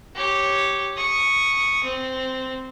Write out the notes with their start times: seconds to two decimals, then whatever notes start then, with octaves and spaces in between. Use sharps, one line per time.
0.15 G4 C#5
0.96 C#6 D#6
1.84 C4